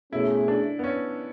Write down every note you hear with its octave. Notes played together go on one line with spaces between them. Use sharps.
B2 A3 C#4 E4 G#4
D4
B3
C#4